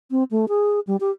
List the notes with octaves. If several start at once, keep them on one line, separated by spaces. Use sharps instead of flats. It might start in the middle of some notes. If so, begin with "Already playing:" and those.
C4
A3
G#4
G3
G4